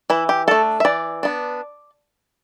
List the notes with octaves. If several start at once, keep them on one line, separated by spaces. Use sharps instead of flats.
E3 E4
G4
A3 D4 A4
E5
E3 D5
B3 D4